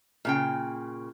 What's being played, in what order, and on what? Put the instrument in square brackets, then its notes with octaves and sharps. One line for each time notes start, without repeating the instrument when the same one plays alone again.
[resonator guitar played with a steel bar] A#2 C#3 G5